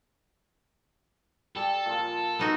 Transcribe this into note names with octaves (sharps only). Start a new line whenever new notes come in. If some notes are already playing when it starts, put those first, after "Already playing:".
G3 A4
A#2 F3
B3 D#4 F#4